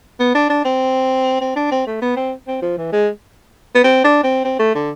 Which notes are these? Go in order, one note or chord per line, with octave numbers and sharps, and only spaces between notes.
B3
D4
D4
C4
C4
D4
C4
A3
B3
C4
C4
F3
E3
G#3
B3
C4
D4
C4
C4
A3
D3